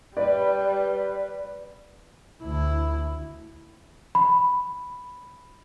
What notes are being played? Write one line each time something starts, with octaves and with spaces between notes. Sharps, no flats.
G3 B4 D5
D2 E4
B5